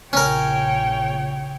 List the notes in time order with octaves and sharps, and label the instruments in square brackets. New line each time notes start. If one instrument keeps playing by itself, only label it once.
[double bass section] A#1 C#3 [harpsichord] C#4 A#4 [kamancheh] C#5 G5